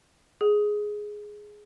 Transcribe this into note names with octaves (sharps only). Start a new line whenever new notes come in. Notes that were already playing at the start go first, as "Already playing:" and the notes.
G#4